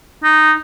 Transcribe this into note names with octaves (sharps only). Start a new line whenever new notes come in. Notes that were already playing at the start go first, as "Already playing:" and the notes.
D#4